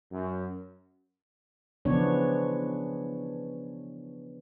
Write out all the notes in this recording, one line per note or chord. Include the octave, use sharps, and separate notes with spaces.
F#2
C#3 E3 F3 B3 D4 C#5